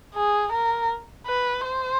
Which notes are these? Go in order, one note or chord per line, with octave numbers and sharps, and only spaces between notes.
G#4
A#4
B4
C5